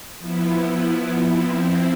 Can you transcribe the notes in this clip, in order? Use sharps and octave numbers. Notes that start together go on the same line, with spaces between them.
F3 B3 E4
F3 C4 E4